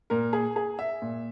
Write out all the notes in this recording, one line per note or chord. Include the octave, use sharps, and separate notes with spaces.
A#2 A#4
G#4
G#4
E5
A#2